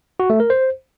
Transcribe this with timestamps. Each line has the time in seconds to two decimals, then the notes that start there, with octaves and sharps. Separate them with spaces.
0.20 F#4
0.30 A3
0.40 A#4
0.50 C5